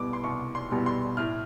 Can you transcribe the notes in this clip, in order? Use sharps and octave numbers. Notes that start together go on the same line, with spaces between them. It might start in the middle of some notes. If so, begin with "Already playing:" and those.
Already playing: C2 B2 G3 B3 E4 D6
C6
C2 C#6
C6
B2 G3 B3 E4
C6
A2 F6